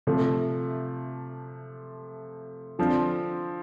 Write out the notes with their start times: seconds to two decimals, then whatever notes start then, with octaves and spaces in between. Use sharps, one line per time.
0.07 C3 F3 A3
2.79 D3 F3 C4